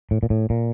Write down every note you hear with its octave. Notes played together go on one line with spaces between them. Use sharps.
A2
A#2
A2
A#2